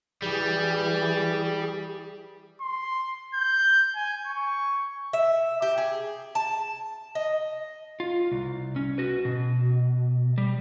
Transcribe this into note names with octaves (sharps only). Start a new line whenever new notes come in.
E3 G3 G4 G#4
C6
G6
G#5
C#6
E5
G4
G#4
A5
D#5
F4
C2
C#4
F#4 B4
B2
G3